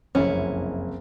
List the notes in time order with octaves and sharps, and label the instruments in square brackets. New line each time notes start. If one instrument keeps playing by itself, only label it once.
[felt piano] F#1 C2 F2 [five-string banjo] C#4 E4